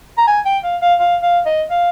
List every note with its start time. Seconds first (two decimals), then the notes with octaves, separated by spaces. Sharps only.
0.18 A#5
0.28 G#5
0.45 G5
0.64 F5
0.82 F5
1.00 F5
1.23 F5
1.46 D#5
1.70 F5